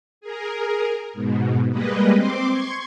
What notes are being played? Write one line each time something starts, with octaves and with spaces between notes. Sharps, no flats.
G#4 A#4
G#2 B2
G3 G#3 A#3 B4 D#5
C4 C6 D6
C6 C#6 G#6